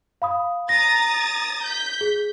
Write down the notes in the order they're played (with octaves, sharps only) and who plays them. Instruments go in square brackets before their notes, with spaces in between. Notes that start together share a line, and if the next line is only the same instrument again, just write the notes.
[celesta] F5 B5 D#6
[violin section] A#5 D#6 A6 [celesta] A#6
[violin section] G6 B6
[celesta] G#4